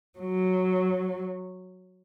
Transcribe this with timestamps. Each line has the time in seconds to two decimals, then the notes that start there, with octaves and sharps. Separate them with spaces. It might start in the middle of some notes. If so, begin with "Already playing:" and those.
0.19 F#3